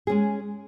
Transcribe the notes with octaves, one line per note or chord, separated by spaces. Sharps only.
G#3 C#4 G#4